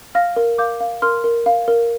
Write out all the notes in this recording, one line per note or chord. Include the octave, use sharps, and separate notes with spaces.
F5 F6 A#6
A#4
F5 D6 G6
F5
A#4 C6 F6
A#4
F5
A#4